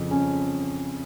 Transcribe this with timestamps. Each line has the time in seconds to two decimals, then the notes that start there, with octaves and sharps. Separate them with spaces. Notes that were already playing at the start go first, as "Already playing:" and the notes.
Already playing: F2 C#3 F3
0.11 C#4